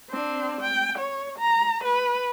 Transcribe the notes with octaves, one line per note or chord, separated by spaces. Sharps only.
C4 D4
G5
C#5
A#5
B4